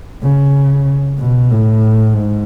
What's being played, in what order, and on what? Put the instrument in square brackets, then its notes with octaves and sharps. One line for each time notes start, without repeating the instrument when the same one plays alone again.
[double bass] C#3
B2
A2
G#2